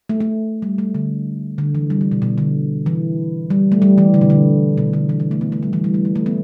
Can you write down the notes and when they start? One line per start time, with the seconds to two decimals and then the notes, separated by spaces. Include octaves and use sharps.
0.09 A3
0.20 A3
0.62 G3
0.78 A3
0.95 D3
1.58 D3
1.75 E3
1.90 G3
2.01 E3
2.12 B2
2.22 B2
2.38 D3
2.86 E3
3.50 G3
3.72 A3
3.82 G3
3.98 E3
4.14 D3
4.21 B2
4.30 D3
4.78 B2
4.93 D3
5.09 E3
5.20 E3
5.31 A3
5.41 B3
5.52 A3
5.63 G3
5.73 E3
5.84 G3
5.94 A3
6.05 A3
6.16 A3
6.26 B3